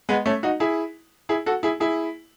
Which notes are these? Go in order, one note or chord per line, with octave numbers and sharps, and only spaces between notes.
G#3 B3
A3 C#4
D#4 F#4
E4 G#4
E4 G#4
F#4 A4
E4 G#4
E4 G#4